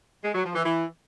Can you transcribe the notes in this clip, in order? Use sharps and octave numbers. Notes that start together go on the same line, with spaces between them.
G#3
F#3
F3
E3
E3